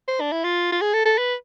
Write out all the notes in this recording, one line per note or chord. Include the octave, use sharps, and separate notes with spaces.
C5
D4
E4
F4
F4
G#4
A4
A4
B4